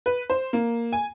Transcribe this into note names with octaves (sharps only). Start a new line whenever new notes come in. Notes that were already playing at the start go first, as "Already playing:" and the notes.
B4
C5
A#3
G#5